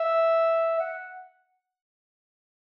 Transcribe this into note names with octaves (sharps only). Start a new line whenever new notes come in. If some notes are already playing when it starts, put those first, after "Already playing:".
Already playing: E5
F#5